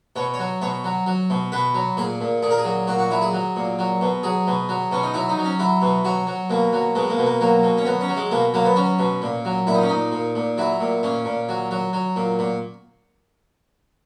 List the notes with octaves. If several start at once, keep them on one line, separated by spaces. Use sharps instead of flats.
B2 C#5
C#5
F#3
B2 C#5
F#3
F#3
B2
B2 B4
F#3
A#2 G#4
A#2
A#2 G#4
A#4
G#4
F#3
A#2 F#4
F#4
F#3 E4
G#4
F#3
A#2
F#3
B2
F#3 G#4
B2
F#3
B2 C#4
D#4
F#3 E4
D#4
F#3
C#4
F#3 E4
B2
F#3 F#4
F#3
B2 A#3
F#3
B2 G#3
A#3
B2
A#3
F#3 A#3
B2
C#4
F#3 B3
C#4
F#3
G#3
B2 A#3
F#3 A#3
B3
F#3 C#4
B2
A#2
F#3
A#2 E4
D#4
C#4
A#2 D#4
A#2
A#2
F#3 E4
A#2
A#2 C#4
A#2
F#3
F#3
F#3
A#2
A#2